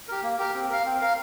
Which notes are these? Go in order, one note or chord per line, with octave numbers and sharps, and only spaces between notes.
G4 A#4
A#3
G4 A#4
C4
A#4 F5
C4
A#4 F5